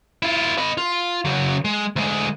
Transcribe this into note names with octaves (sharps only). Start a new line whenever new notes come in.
E4 F4
D#5 B5
F4
C#3 F#3
G#3
D2 G#3